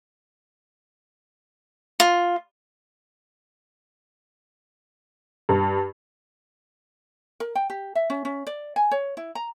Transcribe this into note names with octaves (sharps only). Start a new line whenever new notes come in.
F4
G2
A#4
G5
G4
E5
C#4
C#4
D5
G#5
C#5
E4
A#5